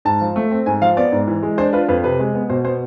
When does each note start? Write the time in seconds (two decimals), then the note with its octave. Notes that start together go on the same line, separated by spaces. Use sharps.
0.05 G#2 A5
0.21 F3
0.36 A3
0.51 C4
0.66 G#2 G#5
0.82 F3 F5
0.97 B3 D5
1.12 G#2
1.27 E3
1.43 G#3
1.58 D4 C5
1.73 F4 B4
1.88 F2 B4
2.04 C3 B4
2.19 G#3
2.35 B3
2.49 B2 C5
2.65 B3 C5